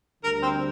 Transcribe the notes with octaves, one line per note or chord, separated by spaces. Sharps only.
D2 D3 G3 D4 A#4
C4